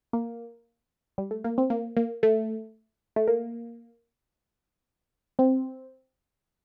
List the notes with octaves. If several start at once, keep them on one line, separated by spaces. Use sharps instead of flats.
A#3
G3
A3
A#3
C4
A#3
A#3
A3
A3
A#3
C4